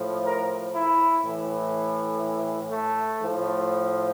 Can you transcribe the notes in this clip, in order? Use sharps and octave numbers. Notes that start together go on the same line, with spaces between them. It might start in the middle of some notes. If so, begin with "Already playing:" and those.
Already playing: A2 F3
A#4
E4
A2 E3
A3
A2 F3